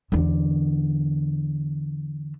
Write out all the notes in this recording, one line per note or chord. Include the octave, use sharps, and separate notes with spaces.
E2 D3